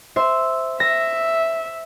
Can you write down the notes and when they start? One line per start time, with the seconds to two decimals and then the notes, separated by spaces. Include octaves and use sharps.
0.16 C5 E5
0.80 E5 A#6